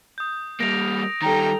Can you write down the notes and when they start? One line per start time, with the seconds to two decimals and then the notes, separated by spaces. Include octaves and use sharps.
0.18 D#6 G6
0.60 G3 A#3 A#6 D7 F7
1.22 D#3 G3 A4 G5 A#5